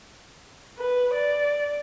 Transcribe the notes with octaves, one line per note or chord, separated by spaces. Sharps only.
B4
D5